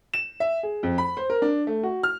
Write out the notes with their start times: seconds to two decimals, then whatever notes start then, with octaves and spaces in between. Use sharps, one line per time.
0.14 E7
0.40 E5
0.63 G#4
0.83 F2
0.98 B5
1.17 C5
1.30 A#4
1.42 D4
1.67 A3
1.83 F#4
2.03 F6